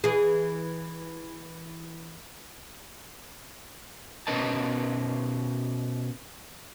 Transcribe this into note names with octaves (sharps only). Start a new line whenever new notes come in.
E3 G#4
B2 C#4 A#4 B4 D#5 A5